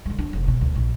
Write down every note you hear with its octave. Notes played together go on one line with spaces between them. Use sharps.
D3 G#3
D#2 D4
F1 D3
B2
D2
A#1